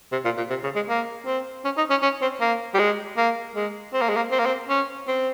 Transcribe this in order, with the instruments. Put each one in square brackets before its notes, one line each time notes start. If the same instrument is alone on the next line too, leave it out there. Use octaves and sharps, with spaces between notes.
[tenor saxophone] C3
A#2
A#2
C3
C#3
G#3
A#3
C4
C#4
D#4
C#4
C#4
C4
A#3
G3
G#3
A#3
G#3
C4
A#3
G#3
A#3
C4
A#3
C4
C#4
C4